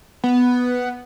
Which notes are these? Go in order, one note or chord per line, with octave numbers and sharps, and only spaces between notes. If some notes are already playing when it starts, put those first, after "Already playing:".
B3